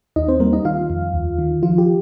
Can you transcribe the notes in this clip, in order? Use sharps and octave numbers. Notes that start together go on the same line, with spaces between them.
D#2 D#4 D#5
C4 C5
G3 A#3 A#4
D#4 D#5
D#3 F4 F5
F2
D#2
D#3
F3 F4
G4